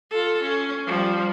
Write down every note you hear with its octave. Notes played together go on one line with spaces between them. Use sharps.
F4 A4
C#4
F3 G3